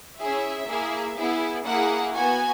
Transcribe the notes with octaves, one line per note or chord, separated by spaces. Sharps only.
C#4 E4 G#4 E5
A#3 E4 G#4
B3 E4 G#4
A#3 E4 G#4 F#5
B3 F#4 G#5